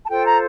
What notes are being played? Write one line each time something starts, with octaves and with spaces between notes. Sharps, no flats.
A5
F4 A4 C5 G5
A#5